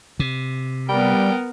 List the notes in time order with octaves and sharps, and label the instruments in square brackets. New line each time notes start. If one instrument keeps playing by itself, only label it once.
[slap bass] C3
[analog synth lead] G3 [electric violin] B3 A#4 [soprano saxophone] G5